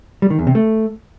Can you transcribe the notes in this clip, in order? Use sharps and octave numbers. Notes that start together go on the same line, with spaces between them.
G3
D#3
E2
C3
A3